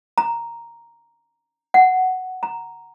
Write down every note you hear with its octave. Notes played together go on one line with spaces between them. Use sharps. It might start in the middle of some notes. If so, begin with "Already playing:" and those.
A#5
F#5
A#5